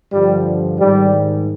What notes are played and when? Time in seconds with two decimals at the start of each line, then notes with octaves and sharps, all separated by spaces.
0.12 G2 D3 F3 G3
0.80 G#2 D#3 G3